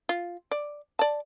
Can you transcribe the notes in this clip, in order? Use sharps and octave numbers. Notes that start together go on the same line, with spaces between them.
F4
D5
D5 A5